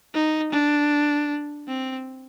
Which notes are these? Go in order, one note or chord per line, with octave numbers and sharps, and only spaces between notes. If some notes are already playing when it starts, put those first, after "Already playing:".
D#4
D4
C4